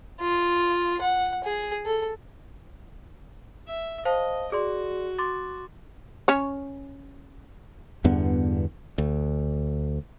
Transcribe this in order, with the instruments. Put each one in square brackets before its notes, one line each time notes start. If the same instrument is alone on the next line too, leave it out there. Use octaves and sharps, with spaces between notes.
[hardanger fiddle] F4
F#5
G#4
A4
[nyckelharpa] E5
[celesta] C5 F5 A5 [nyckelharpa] D#5
[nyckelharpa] F#4 [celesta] G#4 D5 C6
[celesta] C6 D6 A6
[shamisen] C#4 C#5
[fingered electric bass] E2 G2 D3 B3
D2